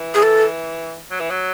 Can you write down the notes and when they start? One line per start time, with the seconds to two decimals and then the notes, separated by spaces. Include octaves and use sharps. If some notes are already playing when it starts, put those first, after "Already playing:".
Already playing: E3
0.15 G#4
0.23 A4
1.11 F#3
1.20 E3
1.30 F#3